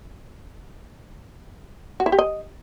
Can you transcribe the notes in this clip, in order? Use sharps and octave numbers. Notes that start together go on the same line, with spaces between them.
F#4
E4
G4
D#5